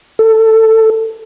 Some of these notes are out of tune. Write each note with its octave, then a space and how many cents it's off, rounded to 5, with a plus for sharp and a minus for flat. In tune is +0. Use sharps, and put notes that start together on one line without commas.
A4 +15